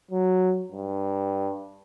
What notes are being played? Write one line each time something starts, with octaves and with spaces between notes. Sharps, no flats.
F#3
G2